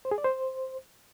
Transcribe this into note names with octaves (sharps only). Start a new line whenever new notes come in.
C5
G#4
D5
C5